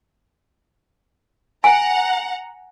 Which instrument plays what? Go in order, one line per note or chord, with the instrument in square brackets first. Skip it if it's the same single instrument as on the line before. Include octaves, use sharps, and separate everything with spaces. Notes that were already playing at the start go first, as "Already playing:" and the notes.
[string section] F#5 A#5 [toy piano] G#5